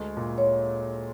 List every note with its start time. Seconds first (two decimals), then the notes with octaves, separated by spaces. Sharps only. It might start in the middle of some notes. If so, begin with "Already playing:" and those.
Already playing: D2 G#3
0.17 A#2
0.38 C#5